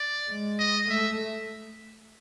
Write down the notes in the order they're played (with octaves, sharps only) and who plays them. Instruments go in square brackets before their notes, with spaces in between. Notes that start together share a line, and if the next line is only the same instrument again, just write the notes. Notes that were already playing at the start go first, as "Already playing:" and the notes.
Already playing: [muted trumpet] D5
[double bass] G#3
[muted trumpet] D#5
[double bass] A3 [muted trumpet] E5